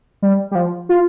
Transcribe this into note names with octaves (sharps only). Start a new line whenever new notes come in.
G3
G3
F3
F4